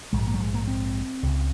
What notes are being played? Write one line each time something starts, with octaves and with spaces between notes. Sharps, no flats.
A#1 G#2 G#3
A#3
F#3
G#3
A#3
C4
C#2 C#3